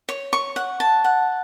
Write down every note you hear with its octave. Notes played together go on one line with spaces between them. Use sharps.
C#5
C#6
F#5
A5
F#5